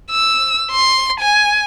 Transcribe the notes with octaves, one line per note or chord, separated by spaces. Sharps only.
E6
C6
G#5